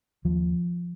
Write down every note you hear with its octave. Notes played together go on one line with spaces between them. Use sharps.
D#2 F3